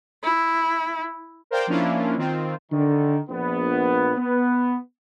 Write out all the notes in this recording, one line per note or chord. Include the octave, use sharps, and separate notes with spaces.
E4
A#4 C5 D5 F5 G5
F3 A#3 C#4 D4 E4 F4
D#3 C4 F4
D3 D#3
A#1 B3
B3